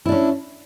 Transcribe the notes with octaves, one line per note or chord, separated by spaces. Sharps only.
C#4 D4 E4